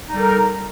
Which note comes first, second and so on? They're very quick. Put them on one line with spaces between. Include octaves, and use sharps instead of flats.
D#4 G3 A4 A#4